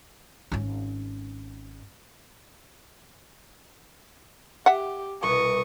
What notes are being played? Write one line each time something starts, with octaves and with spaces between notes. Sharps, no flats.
G#1 C#4
G4 E5 F#5
C2 B2 C#6 D#6